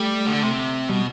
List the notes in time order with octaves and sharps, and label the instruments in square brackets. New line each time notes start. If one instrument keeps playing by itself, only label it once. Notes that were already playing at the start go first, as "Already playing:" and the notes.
Already playing: [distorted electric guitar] G3 [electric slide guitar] A3
[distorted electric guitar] D3
C3
[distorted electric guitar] B2 [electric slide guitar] G3